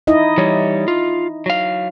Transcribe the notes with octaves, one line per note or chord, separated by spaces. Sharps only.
D#4 E4 D#5
E3 G3 C#5
F4
F#3 F5